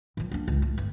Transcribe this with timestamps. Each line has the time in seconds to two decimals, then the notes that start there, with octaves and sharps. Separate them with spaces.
0.17 D#3 F3
0.32 A#3 D4
0.48 C#2
0.62 A2
0.78 G1